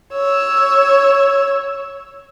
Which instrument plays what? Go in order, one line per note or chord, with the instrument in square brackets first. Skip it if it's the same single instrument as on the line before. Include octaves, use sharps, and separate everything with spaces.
[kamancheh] C#5 E6